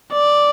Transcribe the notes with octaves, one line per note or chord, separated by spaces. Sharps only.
D5